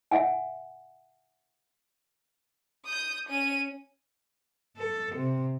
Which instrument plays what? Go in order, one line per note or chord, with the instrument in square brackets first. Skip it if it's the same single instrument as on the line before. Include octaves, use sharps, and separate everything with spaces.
[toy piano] E5 F#5 G#5
[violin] D#6 G6
C#4 D#7
[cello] A4
C3